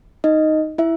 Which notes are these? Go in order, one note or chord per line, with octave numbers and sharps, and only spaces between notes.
D#4 D#5
E4 E5